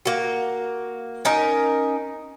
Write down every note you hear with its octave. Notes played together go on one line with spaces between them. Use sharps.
A#3 F#4
C#4 D#4 A#4